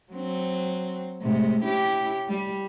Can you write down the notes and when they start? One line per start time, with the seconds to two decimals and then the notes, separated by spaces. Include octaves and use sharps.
0.12 F#3 C4
1.22 A2 C3 G#3
1.64 C#4 E4 G4
2.28 G3